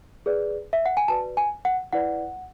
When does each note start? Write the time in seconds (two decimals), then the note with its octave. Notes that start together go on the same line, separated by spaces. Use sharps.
0.26 G#4 B4 D5
0.73 E5
0.86 F#5
0.97 G#5
1.08 F#4 B4 D5 A5
1.37 G#5
1.65 F#5
1.93 E4 B4 D5 F#5